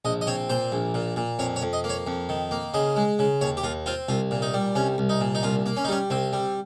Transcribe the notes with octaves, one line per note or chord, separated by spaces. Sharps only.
A#1 D#5
D#5
C4 C#5
A#2 C5
A#1
A#2
A#2
F2 C#5
C#5
F2
D#5
A#3
C#5
F2
D#3
A#3
C#3 D#5
G#3
C#3
D#2 C#5
G4
D#2 F4
C4 F4
C2 F4
A#2
D#4
G3
C2 C#4
C2
D#4
A#2
D#4
C2 F4
A#3
C#4
D#4
G3 C#4
C2 C4
G3